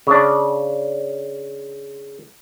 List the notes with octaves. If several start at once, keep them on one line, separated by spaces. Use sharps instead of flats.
C#3 D4